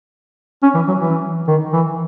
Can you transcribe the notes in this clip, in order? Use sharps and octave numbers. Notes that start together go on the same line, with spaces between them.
C#4
E3
F#3
E3
D#3
E3